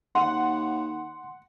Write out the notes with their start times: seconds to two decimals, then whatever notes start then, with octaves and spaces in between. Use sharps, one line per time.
0.15 D#2 F#5 C6